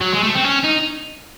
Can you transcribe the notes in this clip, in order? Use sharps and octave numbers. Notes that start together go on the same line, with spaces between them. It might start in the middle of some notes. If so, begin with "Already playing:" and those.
F#3
G#3
A3
C4
C#4
D#4